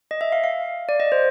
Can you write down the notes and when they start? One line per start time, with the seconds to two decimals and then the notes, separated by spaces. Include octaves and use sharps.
0.11 D#5
0.21 E5
0.32 F5
0.44 F5
0.89 D5
1.00 D#5
1.12 C5